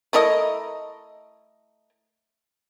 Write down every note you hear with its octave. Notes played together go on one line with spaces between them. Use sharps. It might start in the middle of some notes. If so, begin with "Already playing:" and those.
A3 E4 A#4 D#5